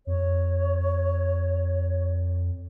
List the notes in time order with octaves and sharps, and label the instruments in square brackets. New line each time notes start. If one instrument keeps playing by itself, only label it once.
[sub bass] F2 [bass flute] C#5